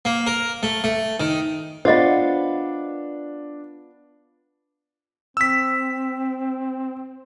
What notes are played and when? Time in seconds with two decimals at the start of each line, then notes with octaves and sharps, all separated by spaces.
0.05 A#3
0.27 A#4
0.63 A3
0.84 A3
1.20 D#3
1.85 B3 D4 F4 C5 D#5
5.37 C4 E6 B6